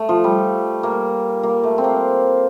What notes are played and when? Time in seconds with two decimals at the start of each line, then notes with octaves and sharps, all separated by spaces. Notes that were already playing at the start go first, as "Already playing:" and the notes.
Already playing: A3
0.09 F3
0.24 G3
0.83 A#3
1.43 A#3
1.63 A3
1.78 C4
1.84 A#3